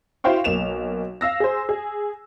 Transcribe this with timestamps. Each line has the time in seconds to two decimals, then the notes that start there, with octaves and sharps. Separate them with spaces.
0.24 E4 F#4 C5 F5 G5 C#6
0.44 B1 A#3 E7 F7
1.21 F5 E6 A#6
1.40 G#4 C5
1.69 G#4